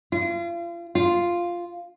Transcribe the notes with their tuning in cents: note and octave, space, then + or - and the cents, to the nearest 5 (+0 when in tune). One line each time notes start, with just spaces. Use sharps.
F4 -35
F4 +0